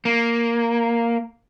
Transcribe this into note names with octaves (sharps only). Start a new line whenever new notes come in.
A#3